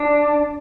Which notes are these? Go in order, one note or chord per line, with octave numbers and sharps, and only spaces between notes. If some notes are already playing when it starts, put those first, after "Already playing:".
Already playing: D4